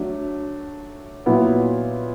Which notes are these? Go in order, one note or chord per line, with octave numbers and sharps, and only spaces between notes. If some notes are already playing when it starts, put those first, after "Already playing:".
Already playing: F#3 A3 D4
A#2 F#3 B3 E4